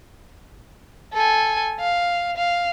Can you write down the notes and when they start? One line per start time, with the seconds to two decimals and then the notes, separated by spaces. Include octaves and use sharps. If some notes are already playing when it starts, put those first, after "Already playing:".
1.14 A4 G#5
1.80 F5
2.37 F5